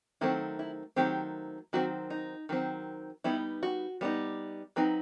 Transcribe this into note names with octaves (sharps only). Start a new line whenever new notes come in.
D#3 F#3 A3 C4 E4
E4
D#3 F#3 A3 C4 G4
D#3 F#3 C4 F#4
D#4
D#3 F#3 C4
G3 B3 D#4 E4
F#4
G3 B3 D#4
F#3 C4 D#4 B4